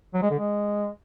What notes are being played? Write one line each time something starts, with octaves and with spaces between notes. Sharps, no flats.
F#3
G#3
D3
G#3